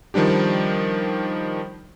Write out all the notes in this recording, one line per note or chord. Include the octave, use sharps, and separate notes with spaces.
D#3 F3 G3 D4 G4